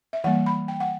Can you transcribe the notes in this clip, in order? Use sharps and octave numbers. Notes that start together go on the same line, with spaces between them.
E5
E3 G3 A#3 F#5
B5
G5
F#5